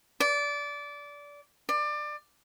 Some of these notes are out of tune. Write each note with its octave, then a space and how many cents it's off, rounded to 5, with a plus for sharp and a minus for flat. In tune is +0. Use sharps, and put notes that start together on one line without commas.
D5 -20
D5 +25